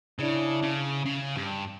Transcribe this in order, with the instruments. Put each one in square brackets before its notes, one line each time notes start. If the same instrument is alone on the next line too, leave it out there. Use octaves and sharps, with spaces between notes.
[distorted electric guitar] C#3 [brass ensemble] D4 E4
[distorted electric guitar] C#3
C#3
G2